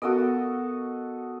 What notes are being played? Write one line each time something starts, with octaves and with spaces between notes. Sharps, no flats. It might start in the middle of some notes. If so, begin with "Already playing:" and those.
B3 F#4 A4 A#4 D#5